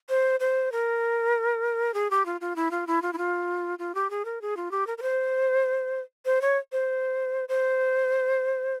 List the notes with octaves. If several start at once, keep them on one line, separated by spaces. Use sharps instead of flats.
C5
C5
A#4
G#4
G4
F4
F4
E4
F4
E4
F4
E4
F4
F4
G4
G#4
A#4
G#4
F4
G4
A#4
A#4
C5
C5
C#5
C5
C5